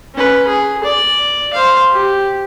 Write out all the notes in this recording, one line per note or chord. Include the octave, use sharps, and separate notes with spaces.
C#4 B4
G#4
D5
C5 F5
G4